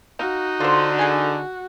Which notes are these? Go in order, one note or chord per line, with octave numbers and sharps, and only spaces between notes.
D#4 F#4 F5
D3 F4 C5
G#4 F#5 G#5